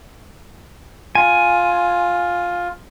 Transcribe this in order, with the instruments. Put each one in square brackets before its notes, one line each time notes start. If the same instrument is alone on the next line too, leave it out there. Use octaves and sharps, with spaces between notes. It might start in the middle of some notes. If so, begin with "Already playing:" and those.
[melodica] F4 [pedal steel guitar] G#5